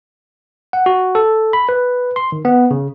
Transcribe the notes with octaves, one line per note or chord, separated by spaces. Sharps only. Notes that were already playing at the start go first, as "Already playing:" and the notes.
F#5
F#4
A4
B5
B4
C6
D#3
B3
C#3